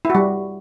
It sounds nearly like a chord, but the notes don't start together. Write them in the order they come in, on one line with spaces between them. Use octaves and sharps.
E4 F#4 G3